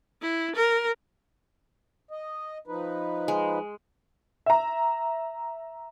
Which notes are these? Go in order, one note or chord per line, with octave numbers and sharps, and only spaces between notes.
E4
A#4
D#5
F3 D#4 B4
G#3
E5 A#5